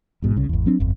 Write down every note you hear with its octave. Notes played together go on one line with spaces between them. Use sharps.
A1 G#2 B2
C2 C#3
G#1 E2
F#3 C4 D4
D1 G1 F2